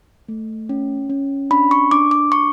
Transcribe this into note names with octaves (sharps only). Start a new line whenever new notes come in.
A3
C#4
C#4
D4 B5
C#6
D4 D6
D6
D4 C#6